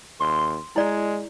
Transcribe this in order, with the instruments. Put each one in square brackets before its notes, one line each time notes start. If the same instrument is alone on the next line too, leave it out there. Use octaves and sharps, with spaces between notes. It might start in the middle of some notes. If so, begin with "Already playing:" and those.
[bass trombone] D#2 [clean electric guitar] C6
[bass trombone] G#3 [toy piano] E4 D5